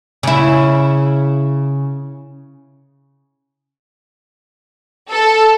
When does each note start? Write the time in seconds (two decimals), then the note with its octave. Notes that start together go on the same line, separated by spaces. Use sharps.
0.23 C#3 E4
5.11 A4